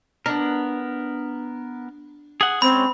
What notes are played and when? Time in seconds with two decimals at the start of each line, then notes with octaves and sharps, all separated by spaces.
0.26 B3 D4 A#4
2.41 G#4 F#5
2.62 G#3 C4 C#4 C#5 B5